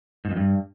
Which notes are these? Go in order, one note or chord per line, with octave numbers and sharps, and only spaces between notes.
G#2
F2
G2